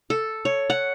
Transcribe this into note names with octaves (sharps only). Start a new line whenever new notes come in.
A4
C#5
F#5